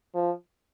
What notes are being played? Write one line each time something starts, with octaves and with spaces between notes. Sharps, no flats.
F3